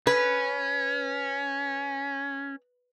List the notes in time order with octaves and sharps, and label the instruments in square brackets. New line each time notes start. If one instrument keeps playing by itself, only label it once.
[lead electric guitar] C#4 [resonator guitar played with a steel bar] B4